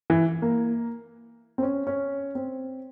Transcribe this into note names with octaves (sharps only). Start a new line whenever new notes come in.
E3
A#3
C4
C#4
C#4
C4